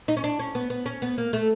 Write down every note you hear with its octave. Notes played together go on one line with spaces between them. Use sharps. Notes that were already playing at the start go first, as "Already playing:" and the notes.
D#4
C#4
D4
C#4
B3
B3
C#4
B3
A#3
A3